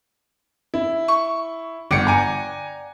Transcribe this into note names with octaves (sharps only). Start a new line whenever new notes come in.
E4
C#6
G1 D5 F#5 G5 C#7
G#5 A#5